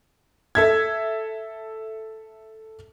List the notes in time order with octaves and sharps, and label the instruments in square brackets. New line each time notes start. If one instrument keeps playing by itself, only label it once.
[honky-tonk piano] A4 E5 G#6